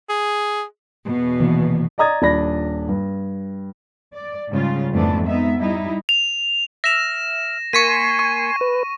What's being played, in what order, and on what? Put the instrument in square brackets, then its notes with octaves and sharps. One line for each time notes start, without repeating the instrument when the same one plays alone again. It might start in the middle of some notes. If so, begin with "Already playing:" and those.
[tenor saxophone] G#4
[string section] E2 B2
[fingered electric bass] C3 D#3 A#3 [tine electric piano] E3
[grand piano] D5 D#5 A#5 D#6 G#6 A6
D#1 D4 B5 A#6
G2
[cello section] D5
G#2 C#3 G3 F4
F2 G#2 E3 A3 B3 D4
G#3 B3 D#4 E5
G3 D#4 E4
[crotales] F7
[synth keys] E5 F6 [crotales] A#6 E7
[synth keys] A#3 B6 C#7 [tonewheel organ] G#5 C6 [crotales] C#6 D#7
[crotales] C#6
[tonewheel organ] B4